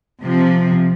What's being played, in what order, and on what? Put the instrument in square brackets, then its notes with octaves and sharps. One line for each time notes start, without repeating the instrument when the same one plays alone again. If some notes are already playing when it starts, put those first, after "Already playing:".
[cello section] C3 F3